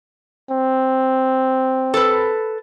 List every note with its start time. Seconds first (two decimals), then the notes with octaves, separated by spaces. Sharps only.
0.51 C4
1.94 A4 B4